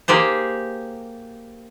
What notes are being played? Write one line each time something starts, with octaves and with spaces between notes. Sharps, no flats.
A#3 G4 G#4 C5